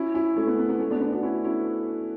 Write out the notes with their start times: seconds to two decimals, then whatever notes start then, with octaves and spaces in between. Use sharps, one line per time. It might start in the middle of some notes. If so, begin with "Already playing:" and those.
Already playing: C#4 E4
0.14 C#4 E4
0.37 A3 C#4
0.47 B3
0.58 B3
0.69 B3
0.80 A3 C#4
0.90 B3 D4
1.01 B3 D4
1.12 D4 F#4
1.23 C#4 E4
1.44 C#4 E4